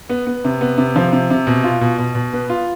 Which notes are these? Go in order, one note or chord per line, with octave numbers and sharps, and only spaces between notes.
B3
B3
C3
B3
C3
F3
C3
C3
B2
F4
B2
B2
B2
B3
F4